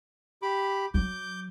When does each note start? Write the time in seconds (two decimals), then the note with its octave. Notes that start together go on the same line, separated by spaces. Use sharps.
0.42 G4 B5 D6
0.94 F#3 D6 G6